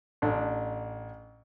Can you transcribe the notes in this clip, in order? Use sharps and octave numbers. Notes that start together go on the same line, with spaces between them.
A1 D4